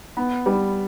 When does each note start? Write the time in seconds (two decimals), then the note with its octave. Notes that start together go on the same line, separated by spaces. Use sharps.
0.17 B3
0.46 G3